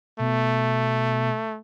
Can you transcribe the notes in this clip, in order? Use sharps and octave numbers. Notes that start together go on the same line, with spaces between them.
B2 A3